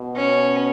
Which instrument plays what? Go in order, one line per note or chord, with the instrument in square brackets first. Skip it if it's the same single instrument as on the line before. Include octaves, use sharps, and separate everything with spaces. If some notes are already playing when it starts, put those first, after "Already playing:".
Already playing: [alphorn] B2
[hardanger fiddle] C#4